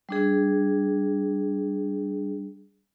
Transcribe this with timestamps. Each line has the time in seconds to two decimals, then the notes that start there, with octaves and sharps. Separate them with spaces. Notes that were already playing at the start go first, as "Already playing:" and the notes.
0.09 G3 D4 G#4